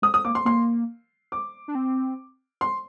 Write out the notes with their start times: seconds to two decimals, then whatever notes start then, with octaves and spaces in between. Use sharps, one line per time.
0.02 G#3 D#6
0.14 D#6
0.25 A#3 D6
0.35 C6
0.45 A#3 C6
1.32 D6
1.68 D4
1.75 C4
2.61 C6